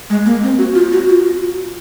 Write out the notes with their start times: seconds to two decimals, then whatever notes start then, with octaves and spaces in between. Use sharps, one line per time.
0.10 G#3
0.26 A#3
0.43 C4
0.58 F#4
0.75 F4
0.92 F#4
1.08 F4